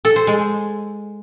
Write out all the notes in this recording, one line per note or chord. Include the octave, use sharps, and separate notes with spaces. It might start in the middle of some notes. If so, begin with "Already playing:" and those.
A4
C5
G#3